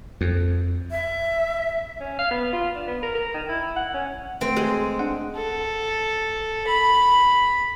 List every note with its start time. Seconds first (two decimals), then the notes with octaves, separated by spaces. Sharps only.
0.21 F2
0.91 E5
2.01 C#4
2.19 F5
2.31 B3
2.53 F4
2.75 D4
2.88 B3
3.03 A#4
3.15 A#4
3.34 D#3
3.49 E4
3.76 F#5
3.94 C#4
4.41 A3 C4
4.56 G#3
4.99 D4 F#5
5.37 A4
6.67 B5